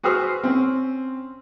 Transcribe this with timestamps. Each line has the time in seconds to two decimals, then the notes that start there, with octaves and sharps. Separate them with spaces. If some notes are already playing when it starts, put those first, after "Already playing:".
0.03 F#4 G#4 B4 C5 E6 F6
0.44 C4 C#4